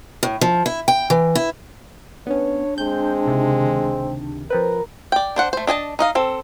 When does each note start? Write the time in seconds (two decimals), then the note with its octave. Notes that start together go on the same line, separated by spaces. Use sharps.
0.23 A2
0.41 F3
0.66 E4
0.88 G5
1.10 E3
1.35 E4
2.27 B3 C#4 D4 C#5
2.78 G#3 C4 G6
3.25 C#2 C3 D#3
4.50 F3 C4 A#4 B4
5.12 D5 G5
5.36 D4 C5 F#5
5.53 A3 C5
5.67 D4 D#5 G#5 A5
5.99 D#4 D#5 F5
6.15 C4 A4